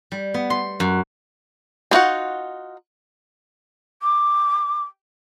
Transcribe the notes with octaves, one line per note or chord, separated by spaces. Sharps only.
G3
B3
C6
F#2
G#3 D#4 F4 F#4 F#5
D6